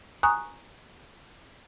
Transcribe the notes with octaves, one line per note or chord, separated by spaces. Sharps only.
G#5 A#5 C#6 D#6 F#6